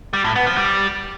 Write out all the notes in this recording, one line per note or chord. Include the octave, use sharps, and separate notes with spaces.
G3
A2
B3
F3
G3